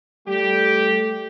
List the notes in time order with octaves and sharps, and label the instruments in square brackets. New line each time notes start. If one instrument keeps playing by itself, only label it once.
[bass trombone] G3 [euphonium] A3 [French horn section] G4